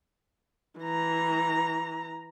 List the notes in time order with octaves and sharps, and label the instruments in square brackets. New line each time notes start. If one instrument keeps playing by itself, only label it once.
[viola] E3 A#5